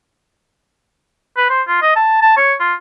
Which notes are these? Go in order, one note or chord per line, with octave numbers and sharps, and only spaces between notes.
B4
C5
F4
D#5
A5
A5
C#5
F4